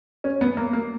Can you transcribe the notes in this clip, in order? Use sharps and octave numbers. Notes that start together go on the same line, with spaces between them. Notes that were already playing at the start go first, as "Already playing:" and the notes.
C#4
B3
A#3
A#3